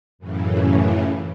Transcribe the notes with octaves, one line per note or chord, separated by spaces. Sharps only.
F#2 A2 C#3 E3